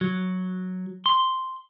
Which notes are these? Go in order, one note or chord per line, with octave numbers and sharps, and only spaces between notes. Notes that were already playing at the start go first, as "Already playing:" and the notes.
F#3
C6